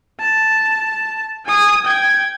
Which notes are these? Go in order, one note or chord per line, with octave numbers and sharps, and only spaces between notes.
A5
G#5 D#6
G5 G#6